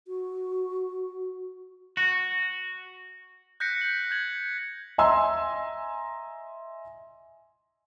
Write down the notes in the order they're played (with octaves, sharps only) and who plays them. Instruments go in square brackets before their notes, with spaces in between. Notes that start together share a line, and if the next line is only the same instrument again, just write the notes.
[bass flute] F#4
[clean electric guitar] F#4
[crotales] F#6 G6 A#6 B6 C#7
B6 F#7
G6 G#6 F#7
[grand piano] D#5 E5 G#5 A#5 C6 E6